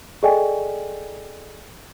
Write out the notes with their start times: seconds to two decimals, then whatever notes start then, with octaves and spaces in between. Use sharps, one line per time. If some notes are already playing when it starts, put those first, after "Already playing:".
0.23 G#4 A4 D5 D#5 G5 G#5